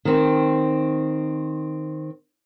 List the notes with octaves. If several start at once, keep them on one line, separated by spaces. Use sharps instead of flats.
D#3 C4